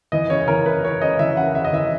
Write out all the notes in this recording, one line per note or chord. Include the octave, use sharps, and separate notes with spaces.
E3 D#5
C#3 C#5
E3 A#4
E3 B4
C#3 C#5
C#3 D#5
E3 E5
C#3 F#5
C#3 E5
D#5
E3 E5